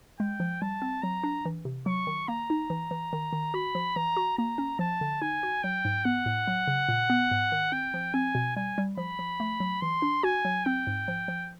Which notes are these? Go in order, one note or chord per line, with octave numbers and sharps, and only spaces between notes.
G#3 G5
F3
G3 A5
C4
F#3 A#5
D4
E3
C3
F#3 C#6
D#3
A#3 A#5
D#4
E3
E3
D#3
D#3
F#4 B5
F3
E3 A#5
F#4
A#3 A#5
C#4
F3 A5
D3
D#4 G#5
F#4
F#3 G5
G#2
B3 F#5
A2
F#3
C#3
A#2
B3
G#2
D#3
C4 G5
F3
C4 G#5
B2
G3 G#5
G3
F3 B5
F3
A3
F#3
E3 C6
D4
F#4 G#5
F#3
C4 G5
G#2
F3
F3